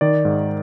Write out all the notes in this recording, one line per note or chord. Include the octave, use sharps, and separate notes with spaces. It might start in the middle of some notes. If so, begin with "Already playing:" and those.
D#3 D5
G#2